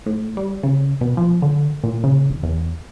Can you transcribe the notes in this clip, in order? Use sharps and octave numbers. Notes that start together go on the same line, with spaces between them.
A2
G3
C#3
B2
F3
D3
A#2
C#3
E1
E2